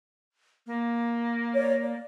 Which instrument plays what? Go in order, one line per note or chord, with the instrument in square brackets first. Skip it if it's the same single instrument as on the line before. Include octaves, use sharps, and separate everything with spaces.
[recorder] A#3
[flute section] C#5 D5
D5